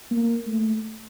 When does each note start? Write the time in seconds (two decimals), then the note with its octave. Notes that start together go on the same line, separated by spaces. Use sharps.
0.11 A#3
0.47 A3